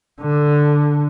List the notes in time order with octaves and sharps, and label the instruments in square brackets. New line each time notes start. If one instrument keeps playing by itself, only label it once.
[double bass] D3